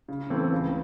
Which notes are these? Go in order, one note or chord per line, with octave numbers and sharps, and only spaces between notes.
C#3
E3 A3 C4
C#2